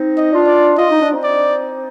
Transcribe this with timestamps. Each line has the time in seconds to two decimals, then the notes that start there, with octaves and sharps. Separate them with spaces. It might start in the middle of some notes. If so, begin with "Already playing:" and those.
Already playing: C4 D#4
0.17 D#5
0.32 D4 F4
0.47 D5
0.78 F4 D#5
0.90 D#4
1.02 D4
1.13 C4 D#4
1.24 D5